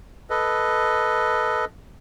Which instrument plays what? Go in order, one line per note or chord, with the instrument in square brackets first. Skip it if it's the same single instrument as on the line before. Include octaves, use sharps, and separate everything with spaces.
[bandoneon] A4 B4 D#5